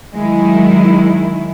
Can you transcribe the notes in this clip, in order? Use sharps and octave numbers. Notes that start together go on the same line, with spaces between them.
D#3 F#3 G#3 E4